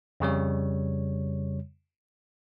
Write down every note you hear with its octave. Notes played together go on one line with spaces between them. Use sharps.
F2 C#3 G3 C#5